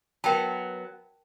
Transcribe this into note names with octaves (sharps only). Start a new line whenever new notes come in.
F#3 B3 A#4 G5 A5